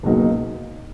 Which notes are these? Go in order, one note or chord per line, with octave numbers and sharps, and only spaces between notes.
C#2 B2 F#3 A#3 D#4